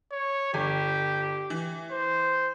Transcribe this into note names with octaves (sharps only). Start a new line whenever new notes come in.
C#5
G1 G4
E3
C5